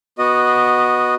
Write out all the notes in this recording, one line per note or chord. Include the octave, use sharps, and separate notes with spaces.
B3 F#4 D#5